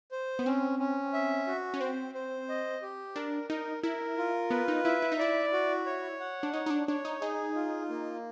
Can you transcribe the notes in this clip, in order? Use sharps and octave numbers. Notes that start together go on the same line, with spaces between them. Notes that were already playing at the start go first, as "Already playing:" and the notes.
C5
B3
C4 C#4
C#4
E5
F#4
C#4
C4 C5
C5
D#5
G4
D4 A#4
D#4 A#4
E4 A#4
F4
B3 B4
D#4
E4 E5
E4
D#4
E4 D5
F#4
C#5
F#5
D4
D#4 C#5
D#4
D4
D4 C#5
D#4
D#4 G#4
F4
A#3